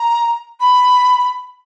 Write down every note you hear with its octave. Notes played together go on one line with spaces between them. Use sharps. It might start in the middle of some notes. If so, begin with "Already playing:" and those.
Already playing: A#5
B5